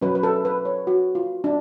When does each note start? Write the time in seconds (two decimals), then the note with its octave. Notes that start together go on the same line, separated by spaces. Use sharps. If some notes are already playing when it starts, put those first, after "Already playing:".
0.02 F#3 C#4 B4
0.15 B4
0.23 A4
0.45 B4
0.65 C#5
0.87 F#4
1.15 F4
1.44 D4